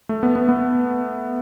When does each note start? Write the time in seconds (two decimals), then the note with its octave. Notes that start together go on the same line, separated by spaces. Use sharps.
0.09 A3
0.23 B3
0.36 B3
0.49 B3